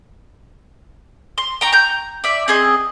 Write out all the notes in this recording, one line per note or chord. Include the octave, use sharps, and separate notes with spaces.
C6
G5 A#5 C#6
A#5 G6
D5 E5
C4 G#4 D#5